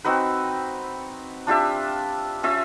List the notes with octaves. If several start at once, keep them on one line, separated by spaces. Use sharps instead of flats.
C4 D#4 F#4 B4
D4 F4 G4 E5
C#4 F4 E5